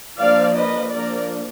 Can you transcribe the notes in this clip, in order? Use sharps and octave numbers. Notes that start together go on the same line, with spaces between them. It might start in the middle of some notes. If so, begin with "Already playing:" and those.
F3 A#3 D4 D5 F5
B4 D#5
F3 A#3 D4 A#4 D5